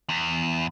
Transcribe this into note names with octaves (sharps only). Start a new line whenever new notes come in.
E2